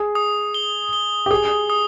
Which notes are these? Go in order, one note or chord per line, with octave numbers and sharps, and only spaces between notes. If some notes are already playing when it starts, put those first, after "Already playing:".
Already playing: G#4
D#6
G7
G7
G4
G#4 D#6
D#6